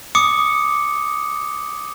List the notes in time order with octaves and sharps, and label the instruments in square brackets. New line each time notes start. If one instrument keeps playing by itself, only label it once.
[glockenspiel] D6 D#6 C#7